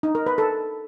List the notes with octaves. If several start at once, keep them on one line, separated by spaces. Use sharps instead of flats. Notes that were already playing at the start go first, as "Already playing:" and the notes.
D#4
A#4
B4
A4